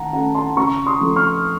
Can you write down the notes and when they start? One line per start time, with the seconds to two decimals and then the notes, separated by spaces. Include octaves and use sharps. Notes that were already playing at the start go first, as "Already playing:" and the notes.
Already playing: D#3 F#5 A5 A#5
0.13 A3 C#4 F#5 A#5
0.35 A5 C6
0.57 C#3 A#5 C#6
0.86 C6 D#6
1.01 F3 A3 C4
1.16 C#6 F6